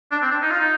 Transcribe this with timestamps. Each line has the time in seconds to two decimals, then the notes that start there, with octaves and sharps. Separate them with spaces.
0.12 D4
0.22 C4
0.31 D4
0.41 D#4
0.50 F4
0.60 D#4